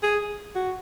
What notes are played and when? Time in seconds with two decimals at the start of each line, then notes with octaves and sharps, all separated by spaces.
0.03 G#4
0.55 F#4